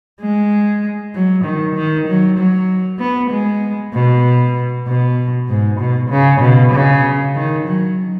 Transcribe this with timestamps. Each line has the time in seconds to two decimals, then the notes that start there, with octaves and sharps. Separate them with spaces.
0.21 G#3
1.14 F#3
1.44 D#3
1.75 D#3
2.07 F#3
2.37 F#3
2.99 B3
3.30 G#3
3.94 B2
4.86 B2
5.49 G#2
5.80 B2
6.10 C#3
6.41 B2
6.72 C#3
7.34 D#3
7.66 F#3